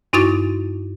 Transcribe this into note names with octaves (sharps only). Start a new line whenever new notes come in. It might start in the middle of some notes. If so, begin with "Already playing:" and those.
G2 D#4 E4 F#4 C#6 A6